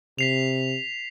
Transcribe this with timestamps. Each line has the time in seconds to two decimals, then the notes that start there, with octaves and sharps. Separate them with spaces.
0.19 C3 B6 C7 F7